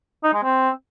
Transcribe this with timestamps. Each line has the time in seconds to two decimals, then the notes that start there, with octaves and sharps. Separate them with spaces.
0.24 D#4
0.33 G#3
0.43 C4